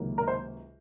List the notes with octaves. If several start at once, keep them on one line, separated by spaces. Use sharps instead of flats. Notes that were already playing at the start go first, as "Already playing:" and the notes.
Already playing: C#2 C3 D#3 F#3 A#3
A#4
C5